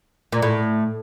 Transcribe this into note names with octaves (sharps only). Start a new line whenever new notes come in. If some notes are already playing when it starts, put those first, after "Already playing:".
A#2
A2